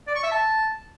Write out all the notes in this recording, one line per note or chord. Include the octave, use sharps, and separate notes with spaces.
D5
C#6
E5
A5